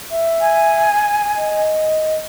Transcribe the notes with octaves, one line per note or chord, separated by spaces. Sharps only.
E5
G#5
D#5